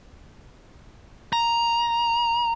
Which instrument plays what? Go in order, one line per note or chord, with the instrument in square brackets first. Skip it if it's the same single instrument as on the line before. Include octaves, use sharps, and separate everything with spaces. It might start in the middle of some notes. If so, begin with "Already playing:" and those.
[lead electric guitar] A#5